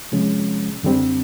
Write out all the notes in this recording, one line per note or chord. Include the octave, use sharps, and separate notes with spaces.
C3 F3 G#3 C#4
F#2 D3 G3 C4